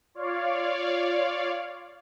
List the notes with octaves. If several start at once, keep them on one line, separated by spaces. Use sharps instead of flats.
F4 C#5 D5 F5